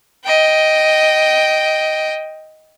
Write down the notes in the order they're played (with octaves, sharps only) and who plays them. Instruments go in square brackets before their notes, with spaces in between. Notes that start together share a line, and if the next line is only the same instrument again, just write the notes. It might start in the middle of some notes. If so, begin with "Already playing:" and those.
[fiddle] D#5 G5